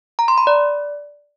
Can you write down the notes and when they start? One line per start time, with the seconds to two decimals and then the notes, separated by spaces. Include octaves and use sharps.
0.19 A#5
0.28 C6
0.38 B5
0.47 D5